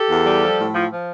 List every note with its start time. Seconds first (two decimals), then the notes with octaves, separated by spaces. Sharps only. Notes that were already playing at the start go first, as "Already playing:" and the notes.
Already playing: G4 A4
0.08 E2
0.25 G3
0.41 F3
0.58 A2
0.74 F3
0.90 F3